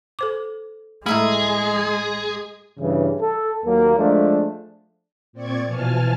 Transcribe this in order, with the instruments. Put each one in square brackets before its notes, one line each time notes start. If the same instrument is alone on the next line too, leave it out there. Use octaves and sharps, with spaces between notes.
[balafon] A4 C5 D6
[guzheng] A2 E5 B5 [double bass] G#3 [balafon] A3 A#5 [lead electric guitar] G#4
[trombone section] G2 C#3 E3
A4
D#2 F#3 A#3
F3 G#3 A3 D4
[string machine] A#2 C4 D5 C#6 G#6
B2 E3 F3 G#5 A5 F6